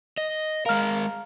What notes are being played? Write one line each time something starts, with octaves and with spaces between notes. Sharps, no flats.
D#5
G#3 A#4 F5 A#5 F6